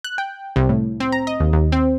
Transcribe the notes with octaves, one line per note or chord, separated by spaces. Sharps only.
F#6
G5
C2
A2
C4
A#5
D#5
D#2
D#2
C4